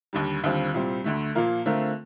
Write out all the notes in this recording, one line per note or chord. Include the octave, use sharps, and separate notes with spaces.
D#2 D3 G3
D#2 D3 G3 C4 F4
C2 A#2 G3 C4
D2 D3 A3
A#2 F3 A#3 F4 A#4
D3 A3 C4 F4 A#4